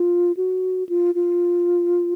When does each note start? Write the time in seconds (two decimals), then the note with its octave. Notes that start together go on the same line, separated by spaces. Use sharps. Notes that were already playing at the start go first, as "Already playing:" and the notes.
Already playing: F4
0.37 F#4
0.89 F4
1.15 F4